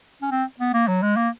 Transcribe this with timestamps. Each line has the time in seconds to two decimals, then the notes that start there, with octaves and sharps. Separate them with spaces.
0.22 C#4
0.31 C4
0.59 B3
0.74 A#3
0.88 F#3
1.02 G#3
1.16 A#3